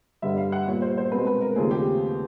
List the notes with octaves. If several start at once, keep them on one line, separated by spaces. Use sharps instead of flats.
G2 D3 G3 E5
F5
F#5
A#2 G3 B3 C#5
C5
C5
B2 G#3 C4 B4
B4
A#4
D#2 C#3 F3 A3 C4 G#4
G4